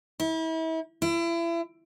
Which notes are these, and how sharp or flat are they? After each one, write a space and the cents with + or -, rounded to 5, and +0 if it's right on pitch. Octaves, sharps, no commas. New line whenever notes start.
E4 -35
E4 +35